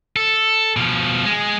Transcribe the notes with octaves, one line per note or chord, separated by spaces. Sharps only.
A4
B2 F3
G#3